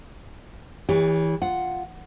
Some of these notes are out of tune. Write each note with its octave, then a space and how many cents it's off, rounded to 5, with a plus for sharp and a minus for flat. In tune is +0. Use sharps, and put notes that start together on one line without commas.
E3 -20 G4 +35 C#5 +30
F4 +0 F#5 +0